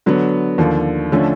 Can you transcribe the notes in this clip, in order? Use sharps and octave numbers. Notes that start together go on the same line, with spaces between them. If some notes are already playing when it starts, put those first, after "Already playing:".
D3 F#3 B3
D#2 D3 F3
D3 F3 A3 C#4